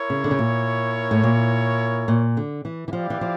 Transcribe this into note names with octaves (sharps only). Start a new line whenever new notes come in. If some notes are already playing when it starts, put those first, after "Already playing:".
Already playing: E4 A#4 C#5
C#3
D3
C#3
A#2
A2
A#2
A#2
D3
E3
E3
F3 E4 G4 D5 F5
E3
F3